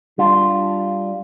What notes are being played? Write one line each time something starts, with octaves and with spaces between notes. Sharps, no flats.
G3 D4 F4